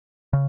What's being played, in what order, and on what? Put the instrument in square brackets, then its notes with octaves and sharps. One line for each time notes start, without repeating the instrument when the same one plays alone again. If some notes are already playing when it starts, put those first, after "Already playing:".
[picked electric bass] C#3